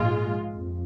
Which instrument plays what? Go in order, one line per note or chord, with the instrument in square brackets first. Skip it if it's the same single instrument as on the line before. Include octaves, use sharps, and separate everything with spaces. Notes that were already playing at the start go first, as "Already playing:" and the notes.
Already playing: [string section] A#1 G#2 G#3 F4
F2